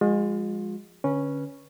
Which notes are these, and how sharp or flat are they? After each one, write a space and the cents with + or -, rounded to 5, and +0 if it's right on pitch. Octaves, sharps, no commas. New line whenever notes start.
F3 +0 G#3 -20 F4 +35
D3 +0 C#4 +0 B4 -20